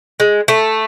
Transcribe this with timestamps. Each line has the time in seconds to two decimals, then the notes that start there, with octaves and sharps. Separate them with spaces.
0.20 G#3
0.48 A3